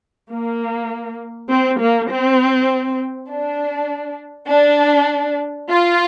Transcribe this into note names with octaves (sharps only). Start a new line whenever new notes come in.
A#3
C4
A#3
C4
D4
D4
F4